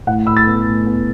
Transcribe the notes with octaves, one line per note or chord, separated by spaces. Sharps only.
A2 F#5
A2 B5 E6
E6 A6
B3
A2
B3